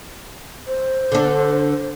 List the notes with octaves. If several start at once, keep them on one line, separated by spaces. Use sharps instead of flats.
C5
D3 D4